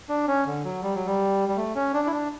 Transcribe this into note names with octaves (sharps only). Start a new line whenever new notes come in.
D4
C#4
D3
F#3
G3
F#3
G3
G3
A3
C#4
D4
E4
D4